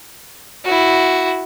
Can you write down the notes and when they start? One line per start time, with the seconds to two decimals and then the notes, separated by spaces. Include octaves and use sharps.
0.65 E4 F#4